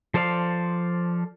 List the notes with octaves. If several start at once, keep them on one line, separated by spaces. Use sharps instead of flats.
F3 A4 C5 D5 F5